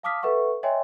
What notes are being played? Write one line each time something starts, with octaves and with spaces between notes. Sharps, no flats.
F5 A5 D6 D#6 F6 B6
A4 B4 E5 F#5 C#6
C#5 D#5 E5 G5 G#5 C6